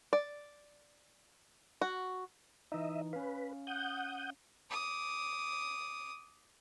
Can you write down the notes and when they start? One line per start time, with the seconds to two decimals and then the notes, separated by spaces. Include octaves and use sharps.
0.13 D5
1.81 F#4
2.72 E3 D#4 D#5 E5
3.13 C#4 B4 F5
3.67 F#5 D#6 G6
4.70 D6 D#6